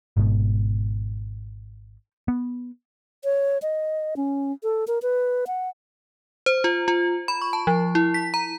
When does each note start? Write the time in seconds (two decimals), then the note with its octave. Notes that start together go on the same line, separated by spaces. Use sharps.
0.17 G#1 G#2 B2
2.28 B3
3.24 C#5
3.62 D#5
4.17 C#4
4.63 A4
4.88 A#4
5.02 B4
5.47 F#5
6.46 C5
6.64 F4
6.88 F4
7.28 B5
7.42 C#6
7.53 A5
7.67 F3
7.95 E4
8.14 B6
8.34 A#5